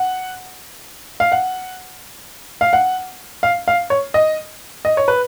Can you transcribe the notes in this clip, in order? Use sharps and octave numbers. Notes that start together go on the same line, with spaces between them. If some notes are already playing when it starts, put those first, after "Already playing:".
Already playing: F#5
F5
F#5
F5
F#5
F5
F5
C#5
D#5
D#5
C#5
B4